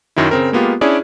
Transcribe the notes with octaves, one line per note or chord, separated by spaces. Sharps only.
F#2 D#3 F#3 E4
C#3 C4 A#4
G#3 A#3 B3 F4 G4
C#4 D4 E4 G#4 D5